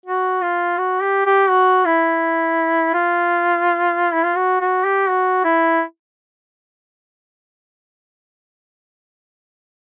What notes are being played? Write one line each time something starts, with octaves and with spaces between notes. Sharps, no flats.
F#4
F4
F#4
G4
G4
F#4
E4
F4
E4
F4
F#4
F#4
G4
F#4
E4